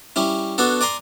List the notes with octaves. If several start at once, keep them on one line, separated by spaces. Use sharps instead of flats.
G3 C#4 E4
B3 D4 F#4 A4
D5 G#5 A#5 C6